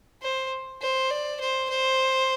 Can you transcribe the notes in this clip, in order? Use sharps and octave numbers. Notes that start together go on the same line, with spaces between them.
C5
C5
D5
C5
C5